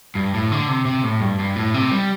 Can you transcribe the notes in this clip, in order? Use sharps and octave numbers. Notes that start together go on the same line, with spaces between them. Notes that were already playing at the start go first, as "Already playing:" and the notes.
G2
A2
D3
C3
C3
A2
G2
G2
A2
C3
G3